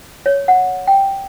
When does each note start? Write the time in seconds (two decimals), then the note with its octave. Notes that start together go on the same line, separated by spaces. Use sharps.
0.26 C#5
0.48 F#5
0.88 G5